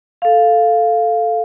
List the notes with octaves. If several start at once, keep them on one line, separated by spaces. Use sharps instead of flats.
A4 F5